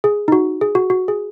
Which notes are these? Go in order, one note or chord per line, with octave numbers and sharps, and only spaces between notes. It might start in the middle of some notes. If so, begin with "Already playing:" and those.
G#4
D#4
F#4
G#4
F#4
F#4
G#4